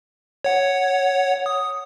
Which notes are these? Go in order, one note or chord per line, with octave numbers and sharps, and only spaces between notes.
C#5 F#5
D#6